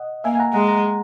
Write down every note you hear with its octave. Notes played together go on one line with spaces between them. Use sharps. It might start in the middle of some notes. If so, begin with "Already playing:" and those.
Already playing: D#5 F#5
A#3 E5 G#5
G#5
F#5 A#5
G#3 F#5 A#5
F#5 A#5